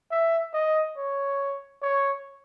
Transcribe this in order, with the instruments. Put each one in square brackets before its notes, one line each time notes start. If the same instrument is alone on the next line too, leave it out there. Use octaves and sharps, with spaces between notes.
[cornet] E5
D#5
C#5
C#5